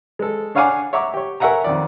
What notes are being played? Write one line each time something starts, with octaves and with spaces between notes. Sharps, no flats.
G#3 A4
D4 C#5 F5 F#5 G#5 D6
C#5 E5 F#5 A#5 D6
G4 C#5
A#4 C#5 E5 F#5 G#5 A#5
F2 D#3 D5